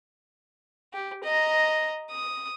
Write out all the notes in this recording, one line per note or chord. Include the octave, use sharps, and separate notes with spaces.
G4
D#5 A#5
D#6